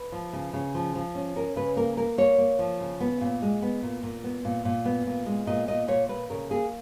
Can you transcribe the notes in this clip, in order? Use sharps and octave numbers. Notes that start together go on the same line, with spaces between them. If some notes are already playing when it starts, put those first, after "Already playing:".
Already playing: B4
F3
C#3
C#3
F3
F3
C#4
C#4 A#4
C#3 B4
A#3 A#4
A#3 A#4
A#3 C#5
A#3
F3
C#3
B3
A#2
G#3
B3
A#2
A#2
B3
A#2
A#2
B3
A#2
G#3
A#2 D#5
A#2 D#5
A#2 C#5
A#2 B4
C#3 A#4
A#3 G#4